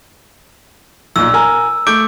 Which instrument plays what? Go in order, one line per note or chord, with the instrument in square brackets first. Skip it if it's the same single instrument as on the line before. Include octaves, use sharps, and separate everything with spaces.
[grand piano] B1 A#2 [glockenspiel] E6
[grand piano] A#4 G#5 A#5
[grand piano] A3 G6 D7 [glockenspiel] D6